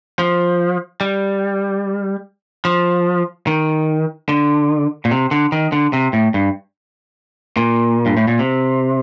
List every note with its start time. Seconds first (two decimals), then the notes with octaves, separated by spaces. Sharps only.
0.19 F3
1.01 G3
2.65 F3
3.47 D#3
4.29 D3
5.05 A#2
5.11 C3
5.31 D3
5.52 D#3
5.72 D3
5.93 C3
6.13 A2
6.34 G2
7.57 A#2
8.06 G2
8.17 A2
8.28 A#2
8.39 C3